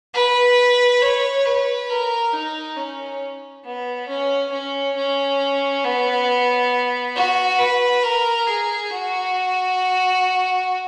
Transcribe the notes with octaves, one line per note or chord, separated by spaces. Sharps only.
B4
C#5
B4
A#4
D#4
C#4
B3
C#4
C#4
C#4
B3
F#4
B4
A#4
G#4
F#4